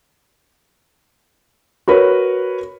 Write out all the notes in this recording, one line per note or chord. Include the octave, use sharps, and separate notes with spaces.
F#4 A#4 B4 C#5